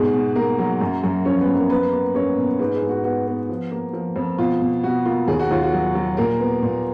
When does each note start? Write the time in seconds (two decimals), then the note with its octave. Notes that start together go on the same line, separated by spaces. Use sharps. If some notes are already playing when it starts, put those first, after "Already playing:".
Already playing: G#2 B2 G#3 G#4
0.13 B2
0.36 A#3 A#4
0.59 F#3
0.81 F#2
1.04 F#2
1.25 F3 C#4 C#5
1.41 B3 B4
1.48 F#2
1.55 A#3 A#4
1.70 A#3 B3 B4
1.92 A#3
2.15 A#3 C#4 C#5
2.38 B2
2.59 G#2 B3 B4
2.74 G#3 G#4
2.82 G#2
2.89 F#4
3.04 B3 F#4
3.28 B3
3.49 F3
3.72 A#3
3.93 F3
4.16 F2
4.38 B2 F4
4.61 B2
4.84 B2 F#4
5.05 A#3 F4
5.28 D#2 G#4
5.40 F#4
5.51 D#2 F4
5.63 F#4
5.73 F#3
5.95 F#3
6.17 A#2 A#3 A#4
6.40 B3
6.63 A#2